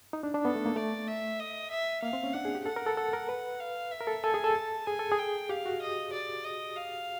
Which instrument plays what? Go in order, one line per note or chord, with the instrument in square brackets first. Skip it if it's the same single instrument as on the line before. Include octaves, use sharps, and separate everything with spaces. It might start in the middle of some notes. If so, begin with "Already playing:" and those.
[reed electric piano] D#4
D4
D4
[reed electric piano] B3 [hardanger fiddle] A4
[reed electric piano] A3
A#3
[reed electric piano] A3 [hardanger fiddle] D5
[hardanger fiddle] E5
D#5
E5
[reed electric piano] A#3 [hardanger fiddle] F5
[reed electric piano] C4
C#4
[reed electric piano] D4 [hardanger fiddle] F#5
[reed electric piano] G#4
G4
[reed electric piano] A4 [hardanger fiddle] F#5
[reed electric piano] A#4
A4
A4
A#4
B4
[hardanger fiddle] F5
E5
[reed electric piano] A#4
A4
[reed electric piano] A4 [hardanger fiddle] G#5
[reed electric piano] G#4
A4
[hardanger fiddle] A5
[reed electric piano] G#4 [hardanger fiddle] G#5
[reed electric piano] A4
G#4
[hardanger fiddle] G5
[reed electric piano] G4 [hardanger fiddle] F5
[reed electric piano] F#4
[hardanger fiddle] D#5
D5
D#5
F5